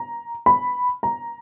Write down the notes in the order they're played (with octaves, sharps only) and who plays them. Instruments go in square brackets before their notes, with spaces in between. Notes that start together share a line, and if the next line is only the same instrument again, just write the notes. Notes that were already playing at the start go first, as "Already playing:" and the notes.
Already playing: [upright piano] A#5
B5
A#5